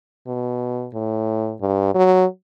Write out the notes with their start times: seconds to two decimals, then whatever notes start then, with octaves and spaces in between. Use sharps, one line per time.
0.27 B2
0.94 A2
1.61 G2
1.95 F#3